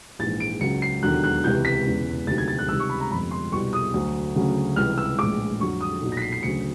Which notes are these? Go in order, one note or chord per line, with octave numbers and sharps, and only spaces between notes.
A#1 G#2 E3 A6
D7
C#2 C#3 F#3 C#7
C7
E1 D#2 D3 F#3 F#6
F#6
C#2 C3 E3 G6
B6
E1 E2 C#3
D2 C3 D#3 F#3 A6
G#6
A6
F#6
C#2 C3 D#3 G3 E6
C#6
B5
A#5
G1 F2 C3 F3 B5
C6
C2 B2 G3 C#6
D#6
D2 D3 F#3
D2 C#3 F#3
C#2 C3 E3 G3 F6
E6
A#1 A2 E3 G#3 D6
F2 D3 F#3 C#6
D#6
B1 A#2 F#3
A#6
B6
C7
C7
D2 C#3 F#3 C#7